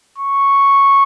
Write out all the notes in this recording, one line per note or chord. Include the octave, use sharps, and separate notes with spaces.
C#6